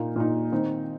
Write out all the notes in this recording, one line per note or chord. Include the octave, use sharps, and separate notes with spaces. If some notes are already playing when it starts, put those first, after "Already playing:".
Already playing: A#2 A#3 D#4
A#2 A#3 D#4
D#3 C4 D#4